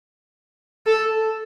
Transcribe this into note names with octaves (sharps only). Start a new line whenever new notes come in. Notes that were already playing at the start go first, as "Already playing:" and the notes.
A4